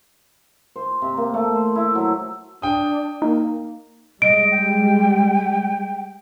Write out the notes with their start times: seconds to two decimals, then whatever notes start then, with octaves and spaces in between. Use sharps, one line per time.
0.76 C5
1.02 C3
1.17 A#3
1.34 A3
1.55 C5
1.75 E4
1.95 F#3
2.62 D4 G5 D#6
3.22 A#3 D#4
4.22 G3 G#3 D#5 D7
4.52 G5